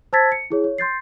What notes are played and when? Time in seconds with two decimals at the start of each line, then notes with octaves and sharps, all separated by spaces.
0.13 C5 A5 E6 G#6 A6 B6
0.32 C#7
0.50 E4 G#4 C#5
0.64 C#5
0.78 C6 G6 A6 C7